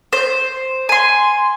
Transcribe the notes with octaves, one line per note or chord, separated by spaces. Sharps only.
C5
G#5 C6